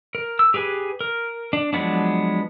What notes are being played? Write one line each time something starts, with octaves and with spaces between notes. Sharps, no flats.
A#4
E6
G4 G#4 B4 G#5
A#4
D4
F3 F#3 G#3 B3 D4